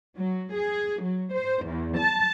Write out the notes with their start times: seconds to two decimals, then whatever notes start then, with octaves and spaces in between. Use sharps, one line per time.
0.16 F#3
0.54 G#4
1.02 F#3
1.33 C5
1.65 E2
1.98 A5